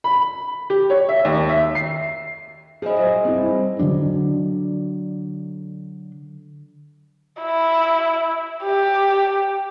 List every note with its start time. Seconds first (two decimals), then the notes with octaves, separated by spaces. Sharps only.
0.04 B5
0.70 G4
0.90 C#5
1.09 E5
1.25 D#2
1.49 E5
1.75 C7
2.82 F3 E4 G#4 D#5
2.97 A#2 F#3
3.25 G2 C4 E4
3.79 D3 D#3 F#3 D4
7.42 E4
8.64 G4